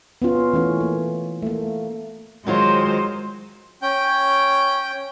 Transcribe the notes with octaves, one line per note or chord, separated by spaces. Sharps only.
B3 C#4 F4
E3 A3 C#4
A#3
A3 A#3
D#3 F#3 G#3 F4 C5
C#4 G5 G6